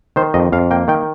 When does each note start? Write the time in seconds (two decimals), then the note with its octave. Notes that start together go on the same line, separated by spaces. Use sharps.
0.16 D#3 C5
0.34 F2 D#5
0.52 F2 F5
0.71 A#3 G5
0.88 D#3 G5